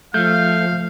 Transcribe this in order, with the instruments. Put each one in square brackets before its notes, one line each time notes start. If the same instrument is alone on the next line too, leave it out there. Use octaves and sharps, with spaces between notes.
[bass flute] F3 [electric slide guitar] A3 [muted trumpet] F5 [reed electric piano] G6